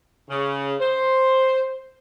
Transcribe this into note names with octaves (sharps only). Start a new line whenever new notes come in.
C#3
C5